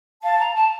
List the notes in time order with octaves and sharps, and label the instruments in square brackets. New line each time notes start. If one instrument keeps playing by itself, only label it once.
[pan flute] F5 [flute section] A5
[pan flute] A#5
A5